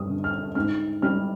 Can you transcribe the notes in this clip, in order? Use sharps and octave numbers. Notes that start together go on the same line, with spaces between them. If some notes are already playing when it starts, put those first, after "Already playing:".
Already playing: G2 D#6
D3
F6
G#2 F6
G3 F6